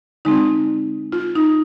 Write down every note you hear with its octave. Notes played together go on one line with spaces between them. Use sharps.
D3 G#3 C4 D#4
F4
D#4